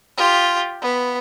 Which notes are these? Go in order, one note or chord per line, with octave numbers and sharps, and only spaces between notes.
F4 G4
B3